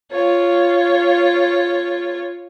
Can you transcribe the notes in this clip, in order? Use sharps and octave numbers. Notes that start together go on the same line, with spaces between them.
F4 C#5